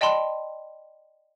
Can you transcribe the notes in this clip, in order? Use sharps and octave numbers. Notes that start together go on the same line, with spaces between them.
D5 D#5 G5 A5 B5 C6